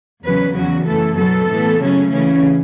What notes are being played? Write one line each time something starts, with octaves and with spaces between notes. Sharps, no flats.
E2 C#3 F#3 C#4 B4
E2 C#3 F#3 C#4 F#4
F#2 E3 A3 A4
B2 F#3 B3 A4
A2 E3 B3
C#3 F#3 A3 C#4
C#3 E3 C#4